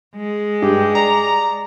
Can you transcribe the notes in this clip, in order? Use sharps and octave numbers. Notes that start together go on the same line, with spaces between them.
G#3
G2 G4
D5 A#5